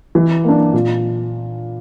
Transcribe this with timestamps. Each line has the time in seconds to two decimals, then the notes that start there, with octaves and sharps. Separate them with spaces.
0.15 E3
0.44 A#3 D4
0.73 A#2